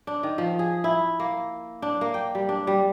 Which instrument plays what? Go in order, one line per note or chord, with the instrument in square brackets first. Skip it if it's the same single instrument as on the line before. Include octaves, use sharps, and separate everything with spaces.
[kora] D4
D#3
F3
G#4
E4
A#3
D4
A#3
G5
G3
D4
G3